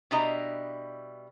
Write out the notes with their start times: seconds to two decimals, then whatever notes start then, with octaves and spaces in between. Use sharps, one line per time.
0.11 B2 G3 D4 E4 D#5 A#5